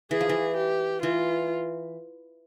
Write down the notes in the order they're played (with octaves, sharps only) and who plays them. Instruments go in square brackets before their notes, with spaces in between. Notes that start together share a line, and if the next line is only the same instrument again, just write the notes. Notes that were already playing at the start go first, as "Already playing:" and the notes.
[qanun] E3 [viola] G#4
[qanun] F3
E3
[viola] G4
[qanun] E3 [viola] F4